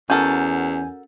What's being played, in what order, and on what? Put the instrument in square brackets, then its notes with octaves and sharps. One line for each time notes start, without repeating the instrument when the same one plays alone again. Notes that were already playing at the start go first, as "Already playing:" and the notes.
[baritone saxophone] E2 [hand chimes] C#4 G6 [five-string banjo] F#4 A4 A#4 [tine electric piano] G#5